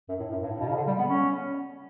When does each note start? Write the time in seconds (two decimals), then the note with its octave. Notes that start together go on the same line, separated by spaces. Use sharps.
0.09 F#2
0.19 A2
0.31 F#2
0.42 G2
0.51 A2
0.60 B2
0.68 C#3
0.76 D3
0.87 G3
0.99 B3
1.10 C#4